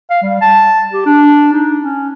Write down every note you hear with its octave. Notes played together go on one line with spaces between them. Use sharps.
F5
G3
A5
G4
D4
D#4
C#4